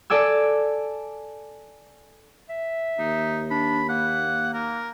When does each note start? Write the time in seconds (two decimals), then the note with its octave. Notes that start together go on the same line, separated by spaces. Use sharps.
0.10 A4 D5 G#5 E6
2.50 E5
2.99 D#2 D#4
3.51 D4 B5
3.89 A#3 F#5
4.54 A#3 A#4